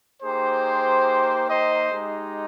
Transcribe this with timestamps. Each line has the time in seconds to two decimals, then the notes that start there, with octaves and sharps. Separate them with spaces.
0.22 A#3 D#4 G4 G#4 C5
1.50 C5 D#5
1.92 G#3 D#4 G4